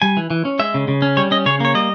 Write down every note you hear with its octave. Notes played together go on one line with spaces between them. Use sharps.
G3 G#5
E3
E3
C#4
G#3 E5
C#3
C#3
C#4
G3 C#5
C#4 D#5
C#3 C#5
A#3 C#5
G3 D#5